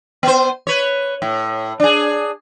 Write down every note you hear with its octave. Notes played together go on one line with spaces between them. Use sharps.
B3 C5
B4 C#5
A2
D4 G#4